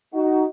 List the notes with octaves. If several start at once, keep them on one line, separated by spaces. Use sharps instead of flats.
D#4 F#4